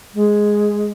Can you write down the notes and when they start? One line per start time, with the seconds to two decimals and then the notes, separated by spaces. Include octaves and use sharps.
0.14 G#3